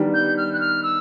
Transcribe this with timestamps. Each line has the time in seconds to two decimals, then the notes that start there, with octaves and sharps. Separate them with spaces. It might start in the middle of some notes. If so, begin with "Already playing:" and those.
Already playing: D#3 G3 B3 D4
0.14 G6
0.37 F6
0.53 F#6
0.60 F6
0.83 E6